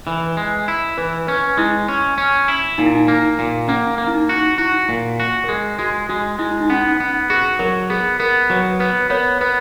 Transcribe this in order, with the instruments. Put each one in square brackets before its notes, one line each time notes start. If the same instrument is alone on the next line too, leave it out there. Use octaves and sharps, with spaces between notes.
[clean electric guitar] E3 [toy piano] B4
[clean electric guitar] G#3
E4
[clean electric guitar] E3 [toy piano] B4
[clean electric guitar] C#4 [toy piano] B4
[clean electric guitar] G#3 [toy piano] E4
[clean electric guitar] C#4
C#4
E4
[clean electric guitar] A#2 [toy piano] D#4
[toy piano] E4
D#4
[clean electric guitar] A#3
A#2
[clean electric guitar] A#3 [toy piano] C#4
[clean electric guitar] A#3
[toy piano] E4
D#4
[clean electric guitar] F#4
[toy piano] E4 [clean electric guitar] F#4
[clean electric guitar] A#2
F#4
[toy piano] A#4
[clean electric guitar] G#3 [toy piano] G#4
[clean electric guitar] G#3 [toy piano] F#4
[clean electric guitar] G#3 [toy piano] F#4
[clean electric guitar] G#3 [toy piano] E4
[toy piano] E4
D#4
[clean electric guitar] B3 [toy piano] C#4
[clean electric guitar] B3
[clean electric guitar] F#4 [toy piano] G#4
[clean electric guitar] F#3 [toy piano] A#4
[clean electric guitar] B3 [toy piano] G#4
[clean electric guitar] B3 [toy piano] A#4
[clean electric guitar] F#3 [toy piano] B4
[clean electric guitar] B3 [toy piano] B4
[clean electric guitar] B3 [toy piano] A#4 C#5
[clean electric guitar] B3 [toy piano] B4